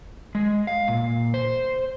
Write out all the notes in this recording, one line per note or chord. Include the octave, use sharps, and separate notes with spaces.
G#3
F5
A#2
C5